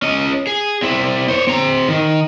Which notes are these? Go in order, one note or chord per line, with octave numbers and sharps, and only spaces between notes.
C#4 D#5
G#4
C4 E4
C5 C#5
C4 A#5
D#3